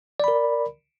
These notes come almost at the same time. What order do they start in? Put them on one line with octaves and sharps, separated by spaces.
D5 B5 A#4